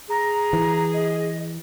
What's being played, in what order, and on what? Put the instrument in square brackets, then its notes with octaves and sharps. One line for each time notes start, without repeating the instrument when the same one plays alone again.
[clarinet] G#4 [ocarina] A#5
[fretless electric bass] E3
[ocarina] D#5